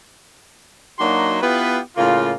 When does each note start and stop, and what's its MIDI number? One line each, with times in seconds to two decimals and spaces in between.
0.99 1.38 54
0.99 1.38 58
0.99 1.38 62
0.99 1.38 63
0.99 1.38 66
0.99 1.38 84
1.42 1.78 59
1.42 1.78 64
1.42 1.78 65
1.42 1.78 67
1.42 1.78 71
1.97 2.33 45
1.97 2.33 49
1.97 2.33 58
1.97 2.33 65